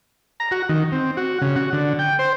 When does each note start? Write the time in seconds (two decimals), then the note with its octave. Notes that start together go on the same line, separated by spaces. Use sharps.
0.40 A#5
0.51 F#4
0.69 D#3
0.92 C4
1.17 F#4
1.41 C#3
1.56 F#4
1.73 D3
1.99 G5
2.19 C5